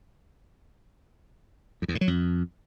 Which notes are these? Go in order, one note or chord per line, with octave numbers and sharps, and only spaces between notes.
F2
E2
A2
F#3
F2